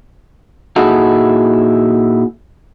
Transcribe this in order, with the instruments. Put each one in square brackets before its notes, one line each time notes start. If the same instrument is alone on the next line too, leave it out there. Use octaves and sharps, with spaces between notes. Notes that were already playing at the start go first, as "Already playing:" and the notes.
[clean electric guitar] A#2 D#4 E4 F#4 G#4 A4